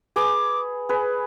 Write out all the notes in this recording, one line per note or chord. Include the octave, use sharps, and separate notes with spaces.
G#4 B4 D6
G#4 B4